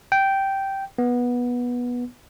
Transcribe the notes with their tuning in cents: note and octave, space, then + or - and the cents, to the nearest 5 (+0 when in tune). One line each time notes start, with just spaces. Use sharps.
G5 -10
B3 -15